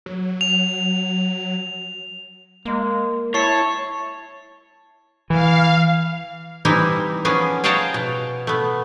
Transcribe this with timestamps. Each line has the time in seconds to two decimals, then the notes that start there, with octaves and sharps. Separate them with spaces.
0.06 F#3
0.41 F7
2.65 G#3 A#3
3.34 E4 C#5 A5 C#6 C7
5.30 E3 F5
6.65 E3 G3 C4 D#4 E4
7.25 F3 B3 C#4 G#4
7.64 G#4 C#5 F5 G5 A5 A#5
7.94 B2
8.47 A3 B3